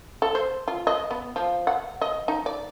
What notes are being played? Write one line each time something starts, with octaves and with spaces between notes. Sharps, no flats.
A4
C5
F4
D#5
B3
F3
F#5
D#5
D#4
D5